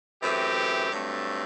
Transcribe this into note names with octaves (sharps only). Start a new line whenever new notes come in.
F#2 E3 A3 C4 G4
G2 F#3 A3 C4